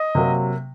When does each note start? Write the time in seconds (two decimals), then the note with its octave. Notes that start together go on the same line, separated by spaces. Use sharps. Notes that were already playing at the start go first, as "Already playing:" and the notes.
Already playing: D#5
0.15 C3 F#3 A#3